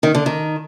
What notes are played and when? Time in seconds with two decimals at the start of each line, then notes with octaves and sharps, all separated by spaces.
0.03 D#3
0.15 D3
0.26 D#3